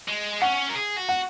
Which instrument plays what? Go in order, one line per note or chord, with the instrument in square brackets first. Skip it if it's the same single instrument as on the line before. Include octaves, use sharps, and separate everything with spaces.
[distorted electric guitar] G#3
[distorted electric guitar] C#4 [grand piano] F#5
[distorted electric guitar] A#4
G#4
F#4
[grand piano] F#5